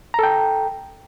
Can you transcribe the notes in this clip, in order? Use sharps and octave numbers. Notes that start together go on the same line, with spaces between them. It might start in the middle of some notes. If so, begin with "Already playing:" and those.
A4 G5 A#5